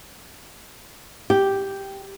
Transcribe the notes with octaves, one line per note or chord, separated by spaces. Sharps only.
G4